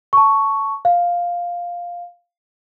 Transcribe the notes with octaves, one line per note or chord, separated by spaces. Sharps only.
A5 C#6
F5